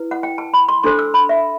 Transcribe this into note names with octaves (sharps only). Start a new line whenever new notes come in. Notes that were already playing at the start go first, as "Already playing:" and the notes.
Already playing: E4 B4
F#5
G5
A5
B5
C6
D4 A4 C5 C6
E6
B5
E5